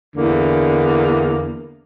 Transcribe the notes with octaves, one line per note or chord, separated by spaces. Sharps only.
E2 D3 A#3